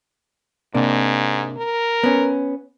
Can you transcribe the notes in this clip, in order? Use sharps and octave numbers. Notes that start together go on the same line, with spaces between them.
G#2 C3 A#3 D4
A#4
B3 C#4